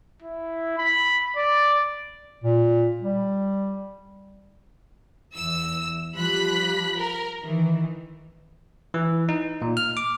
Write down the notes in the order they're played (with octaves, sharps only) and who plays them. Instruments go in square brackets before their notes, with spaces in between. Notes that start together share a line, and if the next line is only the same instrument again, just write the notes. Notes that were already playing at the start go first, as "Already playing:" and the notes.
[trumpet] E4
B5
D5
[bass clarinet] A#2
G3
[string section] E2 E6
F3 G3 B5 F#6 B6
A#4
D#3 E3
[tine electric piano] E3
D#4
A#2
F6
D6